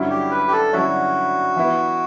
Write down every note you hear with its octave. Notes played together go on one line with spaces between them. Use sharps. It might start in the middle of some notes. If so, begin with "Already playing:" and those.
Already playing: G2 D3 F#3 C#4 E4
G4
B4
G4
A4
G2 D3 F#3 C#4 E4 F#4
E3 B3 E4